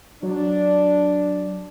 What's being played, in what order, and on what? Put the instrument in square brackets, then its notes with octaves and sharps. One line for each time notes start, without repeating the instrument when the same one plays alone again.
[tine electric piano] F#3 [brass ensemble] D4